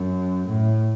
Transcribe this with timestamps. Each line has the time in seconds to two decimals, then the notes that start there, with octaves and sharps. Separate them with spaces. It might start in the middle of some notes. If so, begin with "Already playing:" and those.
Already playing: F#2
0.47 A2